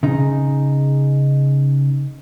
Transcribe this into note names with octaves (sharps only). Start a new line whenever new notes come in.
C#3 D#4